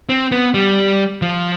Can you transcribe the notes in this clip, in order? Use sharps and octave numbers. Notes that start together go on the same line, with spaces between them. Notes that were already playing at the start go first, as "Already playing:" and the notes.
C4
B3
G3
F3